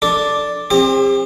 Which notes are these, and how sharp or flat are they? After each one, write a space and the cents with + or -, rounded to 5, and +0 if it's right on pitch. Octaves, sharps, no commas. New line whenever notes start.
D4 +0 A4 +0
C4 +20 G4 +45